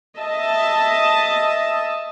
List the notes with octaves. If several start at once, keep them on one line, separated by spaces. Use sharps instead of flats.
D#5 E5 A5